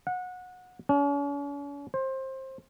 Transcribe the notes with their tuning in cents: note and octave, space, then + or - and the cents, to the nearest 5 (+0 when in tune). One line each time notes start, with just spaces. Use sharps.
F#5 -25
C#4 +45
C5 +20